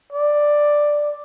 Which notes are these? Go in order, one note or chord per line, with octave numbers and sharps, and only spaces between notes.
D5